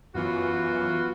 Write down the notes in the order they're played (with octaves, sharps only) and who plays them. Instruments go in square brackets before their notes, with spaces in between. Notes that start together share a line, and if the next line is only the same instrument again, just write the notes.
[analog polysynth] F#2 E3 [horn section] B3 F4 F#4